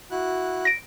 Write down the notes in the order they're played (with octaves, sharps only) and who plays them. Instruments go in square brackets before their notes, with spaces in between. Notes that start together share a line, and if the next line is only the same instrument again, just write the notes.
[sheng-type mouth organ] E4 F#4 F#6
[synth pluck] A#6 D7